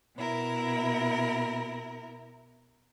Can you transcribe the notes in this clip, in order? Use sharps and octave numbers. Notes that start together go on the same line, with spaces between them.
B2 E4 A#4